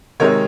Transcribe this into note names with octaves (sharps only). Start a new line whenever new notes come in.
C3 D#3 G#3 A#4 C#5